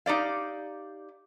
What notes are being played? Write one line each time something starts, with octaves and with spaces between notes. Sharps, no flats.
D#4 G4 D5 F5